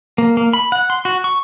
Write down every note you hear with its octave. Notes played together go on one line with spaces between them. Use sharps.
A#3
A#3
B5
F#5
C6
F#4
C#6